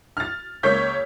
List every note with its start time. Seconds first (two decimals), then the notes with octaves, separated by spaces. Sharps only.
0.17 F6 A6
0.63 C#2 A#3 C#5 G6 B6